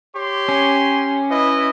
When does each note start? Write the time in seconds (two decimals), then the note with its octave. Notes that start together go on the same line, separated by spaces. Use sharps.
0.16 G4 C#5 C6
0.49 C#4
1.30 E4 B4 D#5